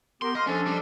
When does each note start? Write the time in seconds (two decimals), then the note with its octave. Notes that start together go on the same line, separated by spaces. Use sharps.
0.22 B3 G4 A#4 C6
0.35 D#5 F5 C6
0.47 F3 C#4 D4 A4
0.66 G3